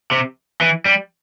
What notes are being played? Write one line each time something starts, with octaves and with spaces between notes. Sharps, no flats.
C3
E3
G3